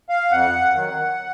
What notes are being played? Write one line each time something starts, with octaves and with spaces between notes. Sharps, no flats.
F5
F2 F#5
D#3 F#3